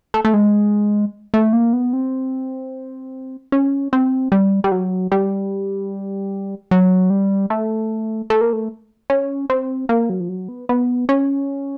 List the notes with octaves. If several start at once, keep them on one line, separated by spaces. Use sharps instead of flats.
A3
A3
G#3
A3
A#3
B3
C4
C#4
C4
G3
G3
F#3
G3
F#3
G3
A3
A3
A#3
A3
C#4
C4
A#3
F#3
F3
F#3
B3
B3
C#4